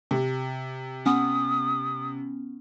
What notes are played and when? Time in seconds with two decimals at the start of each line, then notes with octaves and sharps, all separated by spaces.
0.11 C3
1.06 B3 C#4 D#6